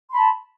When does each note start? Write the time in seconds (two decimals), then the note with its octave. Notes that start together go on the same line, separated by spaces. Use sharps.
0.10 C6
0.13 B5
0.16 A5